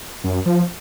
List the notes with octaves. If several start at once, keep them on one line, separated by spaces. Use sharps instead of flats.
F#2
F3